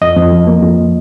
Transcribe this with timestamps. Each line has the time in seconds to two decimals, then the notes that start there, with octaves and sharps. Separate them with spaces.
0.01 F2 D#5
0.17 F2
0.32 F3
0.47 A#3
0.63 F2